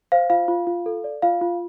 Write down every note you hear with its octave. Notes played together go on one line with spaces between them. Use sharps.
C5 F5
F4 F5
F4
F4
A4
D5
F4 F5
F4